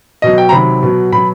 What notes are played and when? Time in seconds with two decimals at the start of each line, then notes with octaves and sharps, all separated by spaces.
0.22 B2 F#3 D#5
0.38 G5
0.49 A#5
0.52 C3 D#3 F#3 B5
0.83 B2 F#3
1.12 B2 F#3 B5